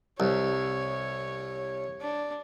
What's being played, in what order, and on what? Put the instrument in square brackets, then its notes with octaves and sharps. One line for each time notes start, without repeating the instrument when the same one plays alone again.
[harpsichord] C2 [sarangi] C#5
[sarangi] D4